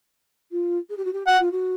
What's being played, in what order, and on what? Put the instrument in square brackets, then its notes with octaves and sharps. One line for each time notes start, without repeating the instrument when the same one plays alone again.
[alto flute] F4
G#4
G4
F#4
G4
[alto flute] F#4 [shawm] F#5
[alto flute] F4
F#4